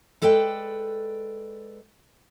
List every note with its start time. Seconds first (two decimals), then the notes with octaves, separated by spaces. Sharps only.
0.22 G#3 A4 B4 D5 G5